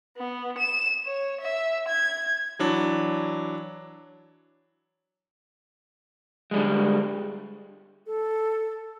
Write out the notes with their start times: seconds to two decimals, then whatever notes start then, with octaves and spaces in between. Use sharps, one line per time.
0.17 B3
0.58 E7
1.06 C#5
1.41 E5
1.88 G#6
2.59 E3 F#3 D4
6.51 D3 G3 G#3
8.06 A4